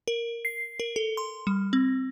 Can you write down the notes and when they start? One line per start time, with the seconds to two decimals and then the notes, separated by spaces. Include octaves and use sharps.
0.08 A#4
0.45 C7
0.80 A#4
0.96 A4
1.17 C6
1.47 G3
1.73 C4